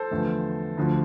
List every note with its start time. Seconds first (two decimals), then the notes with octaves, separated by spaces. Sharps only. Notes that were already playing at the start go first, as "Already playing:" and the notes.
Already playing: A4 C5
0.11 E2 D3 F3 A3
0.78 D2 D3 F3 A3